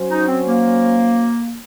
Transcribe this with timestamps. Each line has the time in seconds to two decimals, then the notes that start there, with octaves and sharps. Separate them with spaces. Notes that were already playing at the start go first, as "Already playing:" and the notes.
Already playing: F#3 C#4 F#4 C5
0.11 D#4
0.28 C4
0.47 A#3